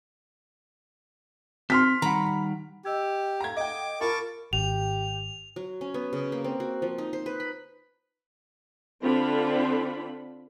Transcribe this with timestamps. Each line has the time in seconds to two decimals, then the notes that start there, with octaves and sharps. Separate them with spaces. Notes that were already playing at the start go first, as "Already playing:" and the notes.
1.70 C4 C6 F6 B6
2.02 D#3 G3 F#5 A#5 B5
2.85 G4 D#5 E6 G#6
3.41 A4 F5 F#5 A#5 G#6
3.56 D#5 G5 D6
4.01 F4 A#4 A5 B5 C#6 D6
4.53 G#1 G4 F7
5.56 F#3
5.81 C#4
5.94 B3
6.13 C#3
6.32 A#3
6.44 C4
6.60 F#4
6.82 F3
6.98 D#4
7.13 C5
7.26 B4
7.40 B5
9.03 D3 C4 D4 F4 A4 B5